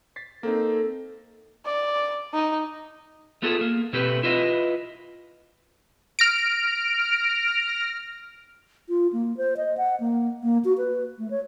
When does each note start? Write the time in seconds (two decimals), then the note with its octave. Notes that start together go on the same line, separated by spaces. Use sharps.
0.16 A6 B6 C7
0.43 A#3 C4 D#4 A4
1.65 D5
2.33 D#4
3.42 A3 B3 F4 G#4 A4
3.61 A#3
3.93 B2 A3 C4 G4 B4
4.23 E4 F4 B4 D#5
6.19 F6 A#6 D7
8.89 F4
9.13 A#3
9.37 C5
9.57 D#5
9.77 F#5
10.00 A#3
10.43 A#3
10.65 F#4
10.78 B4
11.19 A3
11.30 C#5